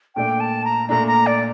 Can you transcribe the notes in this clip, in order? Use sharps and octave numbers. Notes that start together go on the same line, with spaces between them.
A#2 A3 D4 G5
A5
A#5
A#2 A3 D4 A#5
A#5
D5